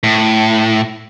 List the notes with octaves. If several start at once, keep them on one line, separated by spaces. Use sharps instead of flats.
A2